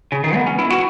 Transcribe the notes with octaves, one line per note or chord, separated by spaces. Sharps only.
C#3
D#3
B3
C#4
E4
F#4